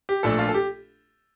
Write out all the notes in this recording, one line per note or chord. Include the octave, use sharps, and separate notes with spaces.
G4
A#1 A#2 A3 D4 A4
F4
A4
G4